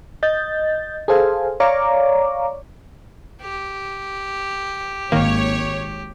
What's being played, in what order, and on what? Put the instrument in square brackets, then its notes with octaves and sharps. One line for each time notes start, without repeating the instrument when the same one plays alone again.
[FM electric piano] D#5 G6 A6
G#4 A4 C5 F5 G#5
C#5 D5 F5 A#5 C#6 D6
[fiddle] G4
[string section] G#1 C#5 [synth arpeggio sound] D#3 A#3